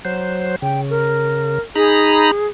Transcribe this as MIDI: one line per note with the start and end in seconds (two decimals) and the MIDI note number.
0.05 0.56 54
0.05 0.56 72
0.62 1.59 49
0.62 0.81 79
0.90 1.60 70
1.75 2.31 63
1.75 2.47 68
1.75 2.31 82
1.75 2.31 83